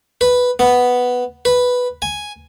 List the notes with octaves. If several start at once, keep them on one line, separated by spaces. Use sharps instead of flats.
B4
B3
B4
G#5